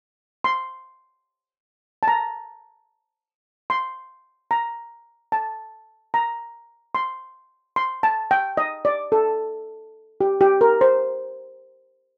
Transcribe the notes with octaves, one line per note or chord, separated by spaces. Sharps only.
C6
A5
A#5
C6
A#5
A5
A#5
C6
C6
A5
G5
D#5
D5
A4
G4
G4
A#4
C5